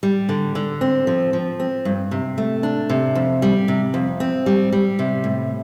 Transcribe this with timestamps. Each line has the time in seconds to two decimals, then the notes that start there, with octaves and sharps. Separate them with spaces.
0.03 G3
0.29 D3
0.55 D3
0.81 C4
1.07 F3
1.33 F3
1.60 C4
1.85 G2
2.11 C3
2.38 A3
2.63 D4
2.90 C3
3.15 F2
3.42 G3
3.68 C3
3.94 F2
4.20 C4
4.46 G3
4.72 G3
4.99 C3
5.24 A2